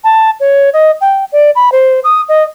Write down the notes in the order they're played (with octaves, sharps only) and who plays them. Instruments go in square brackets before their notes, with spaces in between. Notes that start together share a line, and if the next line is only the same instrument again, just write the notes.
[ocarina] A5
C#5
D#5
G5
D5
B5
C5
D#6
D#5